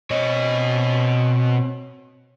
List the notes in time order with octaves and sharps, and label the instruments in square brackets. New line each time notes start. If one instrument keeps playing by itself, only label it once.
[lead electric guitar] B2 D#5 [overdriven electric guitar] C4 C#5